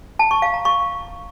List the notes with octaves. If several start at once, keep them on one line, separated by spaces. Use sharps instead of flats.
A5
C#6
F5
A#5
C#6